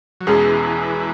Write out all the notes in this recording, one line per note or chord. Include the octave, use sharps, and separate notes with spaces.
F#3
E2 B2 E3 G#3 C#4 G#4